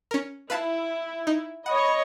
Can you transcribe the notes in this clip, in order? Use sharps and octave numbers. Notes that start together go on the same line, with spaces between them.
C#4 A#4
E4 B4 F5 A5
D#4
C#5 D#5 F#5 B5